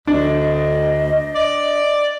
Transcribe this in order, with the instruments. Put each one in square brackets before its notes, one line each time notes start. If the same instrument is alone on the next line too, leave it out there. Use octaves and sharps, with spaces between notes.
[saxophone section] D2 [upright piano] D4 [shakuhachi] D#5
[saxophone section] D5